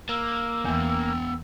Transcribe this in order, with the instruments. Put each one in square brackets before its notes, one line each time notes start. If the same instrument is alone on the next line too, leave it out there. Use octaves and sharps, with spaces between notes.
[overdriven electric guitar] A#3 [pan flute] E6
[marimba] E2 E3 [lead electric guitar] B3 G5